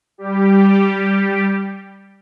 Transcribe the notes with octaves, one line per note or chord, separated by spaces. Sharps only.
G3 G4